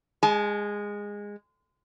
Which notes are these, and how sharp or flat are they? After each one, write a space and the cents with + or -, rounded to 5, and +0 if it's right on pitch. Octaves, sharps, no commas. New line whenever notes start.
G#3 -15 G#5 +45